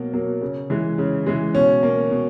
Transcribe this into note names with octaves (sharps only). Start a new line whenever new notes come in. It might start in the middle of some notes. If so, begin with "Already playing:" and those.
Already playing: B2 F#3 A#3
F#3 A#3
C#3
E3 G#3
C#3
E3 G#3
B2 C#4
A#3
B2